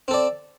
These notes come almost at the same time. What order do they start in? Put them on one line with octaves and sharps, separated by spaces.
C4 A4 D5